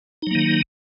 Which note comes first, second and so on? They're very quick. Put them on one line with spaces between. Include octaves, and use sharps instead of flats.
D#4 F#3 A#3 D#3